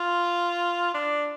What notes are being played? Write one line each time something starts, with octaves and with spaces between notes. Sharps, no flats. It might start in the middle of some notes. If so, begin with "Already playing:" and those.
Already playing: F4
D4